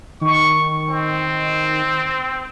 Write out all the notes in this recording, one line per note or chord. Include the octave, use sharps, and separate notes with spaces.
D#3 C#6
C4